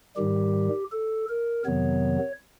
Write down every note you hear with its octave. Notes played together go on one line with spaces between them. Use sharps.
G#2 D#3 G3 G4
A4
A#4
F2 C3 D#3 F#3 B3 C#5